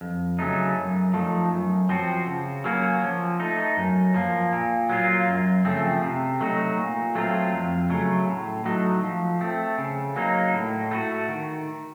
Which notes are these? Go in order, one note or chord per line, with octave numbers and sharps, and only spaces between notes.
F2
C#3 F#3 A3 D#4
F#2
F3 A3 D#4
F#2
F3 C4 F#4
C#3
F#3 A#3 C#4 F#4
F3
A3 D#4
F#2
F3 A#3
A#2
F#3 A#3 F4
F#2
C#3 F3 A3 C4
C3
F#3 A3 D#4 F#4
A#2
F#3 A3 C4 F4
F2
C#3 F#3 A3
A2
F#3 A3 D#4 F#4
F3
A3 C4
C#3
F#3 A#3 D#4
A2
A3 D#4 F#4
D#3